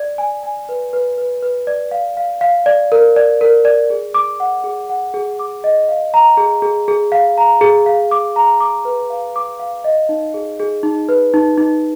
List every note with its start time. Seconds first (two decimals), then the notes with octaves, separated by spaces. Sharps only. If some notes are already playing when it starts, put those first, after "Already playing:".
Already playing: D5
0.18 G#5
0.43 G#5
0.69 B4
0.93 B4
1.18 B4
1.42 B4
1.67 D5
1.91 F5
2.17 F5
2.41 F5
2.66 D5
2.92 A#4
3.16 D5
3.41 A#4
3.65 D5
3.90 G#4
4.14 D6
4.40 F#5
4.64 G#4
4.90 F#5
5.14 G#4
5.39 D6
5.64 D#5
5.89 F5
6.14 A#5
6.37 G#4
6.62 G#4
6.88 G#4
7.12 F5
7.38 A#5
7.61 G#4
7.86 F5
8.11 D6
8.36 A#5
8.60 D6
8.85 B4
9.10 F5
9.36 D6
9.59 F5
9.84 D#5
10.09 D#4
10.34 G#4
10.60 G#4
10.83 D#4
11.09 B4
11.34 D#4
11.57 D#4